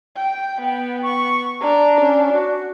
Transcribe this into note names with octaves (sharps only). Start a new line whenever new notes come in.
G5
B3 G5
C#6
D4 A#5
C#4
F#4